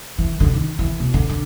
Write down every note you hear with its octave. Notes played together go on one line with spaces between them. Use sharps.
E3
D3
D#3
E3
B2
D3
D3